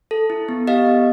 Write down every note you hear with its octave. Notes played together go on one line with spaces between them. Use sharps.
A4
E4
B3
G4 D#5 F5
B3